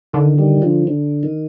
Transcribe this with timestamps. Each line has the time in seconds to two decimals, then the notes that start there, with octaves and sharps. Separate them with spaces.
0.13 D3 D#3
0.38 D#3 G3
0.62 D3 F3
0.87 D3
1.23 D#3